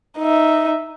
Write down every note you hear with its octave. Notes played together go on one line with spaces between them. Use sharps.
D#4 E5